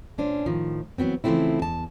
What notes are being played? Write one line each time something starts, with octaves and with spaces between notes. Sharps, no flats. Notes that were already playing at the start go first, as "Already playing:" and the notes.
A#2 C#4 D4 C5
A2 D#3 F3
E3 F#3 B3 C4
C#3 E3 F3 A3 C4 E4
E2 A5